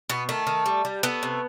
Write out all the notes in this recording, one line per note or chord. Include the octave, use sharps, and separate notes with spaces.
B2 B3
D#3 A3
D#3
G3
G3
A3 B3
C3